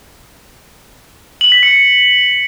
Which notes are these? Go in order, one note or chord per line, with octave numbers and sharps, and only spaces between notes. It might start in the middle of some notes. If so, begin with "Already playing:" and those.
F#7
B6
C#7